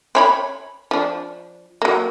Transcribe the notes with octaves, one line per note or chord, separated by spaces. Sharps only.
C4 C#5 B5
F3 D4
F#3 A#3